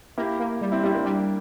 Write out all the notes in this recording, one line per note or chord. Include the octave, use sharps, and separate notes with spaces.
A#3 E4 G4
A#3
G3
C4 E4
G3 C4 E4
A#3 D4
G3